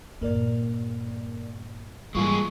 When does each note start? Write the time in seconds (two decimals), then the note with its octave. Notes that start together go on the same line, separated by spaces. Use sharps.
0.21 G2 A#2 A#3 A#4 D5
2.15 G#2 E3 G3 G#3 A#3 F4 G#4 C#6